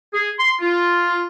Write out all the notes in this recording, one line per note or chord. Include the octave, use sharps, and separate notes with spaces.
G#4
C6
F4